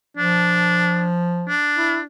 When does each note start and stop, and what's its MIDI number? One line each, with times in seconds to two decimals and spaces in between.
0.17 1.54 53
0.17 1.13 62
1.49 2.04 62
1.77 1.99 64